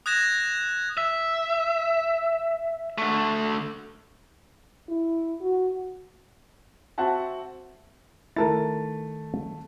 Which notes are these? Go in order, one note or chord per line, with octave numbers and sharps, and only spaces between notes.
D#6 F#6 G#6 A#6 E7
E5
D3 A3
E4
F#4
C4 F#4 E5 F#5 A5
D#3 A3 E4 A4 A#4 A6